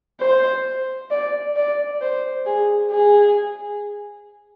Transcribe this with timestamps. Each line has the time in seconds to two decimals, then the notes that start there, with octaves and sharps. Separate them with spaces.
0.20 C5
1.11 D5
1.56 D5
2.01 C5
2.46 G#4
2.91 G#4